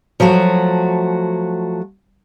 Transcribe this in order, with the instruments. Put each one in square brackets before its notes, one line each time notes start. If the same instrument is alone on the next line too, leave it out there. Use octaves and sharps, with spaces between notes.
[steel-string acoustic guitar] F3 F#3 A3 F#4